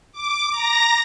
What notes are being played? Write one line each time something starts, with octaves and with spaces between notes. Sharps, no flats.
D6
A#5 A#6